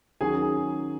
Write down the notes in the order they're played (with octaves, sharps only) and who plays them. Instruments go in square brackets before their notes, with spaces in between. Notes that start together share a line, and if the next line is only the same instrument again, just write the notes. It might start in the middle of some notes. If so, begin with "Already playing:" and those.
[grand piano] D#3 F#3 C#4 G#4 G#5